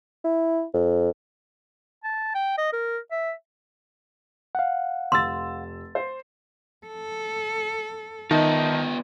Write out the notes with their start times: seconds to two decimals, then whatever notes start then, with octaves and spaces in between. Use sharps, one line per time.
0.25 E4
0.74 F2
2.04 A5
2.35 G5
2.58 D#5
2.73 A#4
3.11 E5
4.55 F5 F#5
5.12 F1 C6 E6 A6
5.95 C5
6.86 A4
8.31 D#3 B3 D#4 F4 D#5 E5 A5